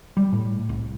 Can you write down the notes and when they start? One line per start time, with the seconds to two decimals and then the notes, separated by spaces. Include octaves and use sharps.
0.17 G3
0.32 A2
0.69 C2